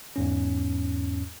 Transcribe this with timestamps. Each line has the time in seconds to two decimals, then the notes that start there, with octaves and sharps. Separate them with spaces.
0.16 E2 G#2 C#4